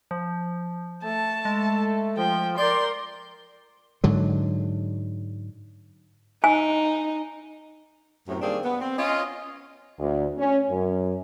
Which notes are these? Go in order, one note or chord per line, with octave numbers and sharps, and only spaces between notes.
F3
A3 A5
G#3
F3 G5
A#4 D5 C6 G6
G#2 D3 F#3
D#4 G#5
F#2 A2 C3
D#3 G3 A#3 C4 D4 G#4
B3
C4
C#4 F4 D#5
D2
C#4
F#2